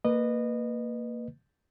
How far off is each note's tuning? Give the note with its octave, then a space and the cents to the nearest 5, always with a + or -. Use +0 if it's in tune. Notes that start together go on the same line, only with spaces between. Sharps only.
A#3 -20 B4 +0 D#5 -25